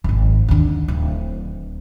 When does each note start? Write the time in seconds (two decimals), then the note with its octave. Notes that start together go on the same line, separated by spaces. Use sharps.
0.04 D#1 G#1
0.48 D#2 D3
0.88 D1